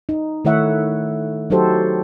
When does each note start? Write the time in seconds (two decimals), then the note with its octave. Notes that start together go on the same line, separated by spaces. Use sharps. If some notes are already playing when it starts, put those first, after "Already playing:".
0.09 D#4
0.45 D#3 A3 E4 C#5 E5 F#5
1.50 F#3 D#4 F#4 G4 A4 C5